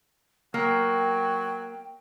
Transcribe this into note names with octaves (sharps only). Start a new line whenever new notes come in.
F#3 A#3 G5